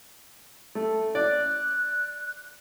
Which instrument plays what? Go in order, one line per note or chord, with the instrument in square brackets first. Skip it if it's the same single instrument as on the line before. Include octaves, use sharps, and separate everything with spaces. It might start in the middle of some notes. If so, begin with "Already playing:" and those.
[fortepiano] A3
[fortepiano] D5 [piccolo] F#6